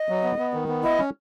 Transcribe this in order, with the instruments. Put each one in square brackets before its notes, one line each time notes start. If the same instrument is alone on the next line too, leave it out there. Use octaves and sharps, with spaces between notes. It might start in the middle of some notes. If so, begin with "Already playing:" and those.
Already playing: [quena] D#5
[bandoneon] F#3
B3
B3
D#3
B3
[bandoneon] E4 [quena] D#5
[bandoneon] C#4